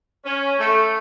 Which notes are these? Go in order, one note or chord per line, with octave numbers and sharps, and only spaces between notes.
C#4
A3